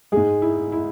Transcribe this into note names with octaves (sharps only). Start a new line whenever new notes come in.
G#2 G#3 G#4
E4
E4